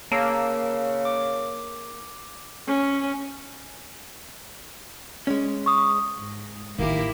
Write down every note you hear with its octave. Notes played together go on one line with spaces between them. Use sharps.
C#3 A#3 A5 E6
D6
C#4
G#3 C#4
C#6 D#6
G#2
A1 D#3 A#3 E4 G4